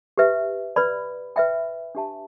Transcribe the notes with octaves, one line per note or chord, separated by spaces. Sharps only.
G4 B4 E5
B4 D5 B5
B4 E5 G5 B5
D4 G4 E5 A5